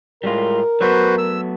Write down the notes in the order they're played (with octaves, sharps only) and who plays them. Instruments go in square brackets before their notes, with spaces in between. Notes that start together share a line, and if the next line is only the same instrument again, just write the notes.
[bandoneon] A2 [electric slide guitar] G3 G#3 F4 [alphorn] A#4
[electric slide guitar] F#3 A3 B3 [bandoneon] F#4 B4 C5
[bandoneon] E6